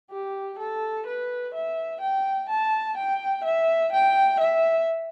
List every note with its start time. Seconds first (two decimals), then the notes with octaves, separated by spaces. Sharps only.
0.11 G4
0.59 A4
1.07 B4
1.54 E5
2.01 G5
2.49 A5
2.97 G5
3.44 E5
3.93 G5
4.40 E5